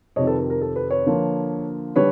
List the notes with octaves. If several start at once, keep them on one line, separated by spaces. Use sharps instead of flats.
F2 C3 D#3 C#5 D#5
A4 B4
A#4
A#4
A4
A4 B4
B4 C#5
D3 F3 A#3
D3 G3 B4 C#5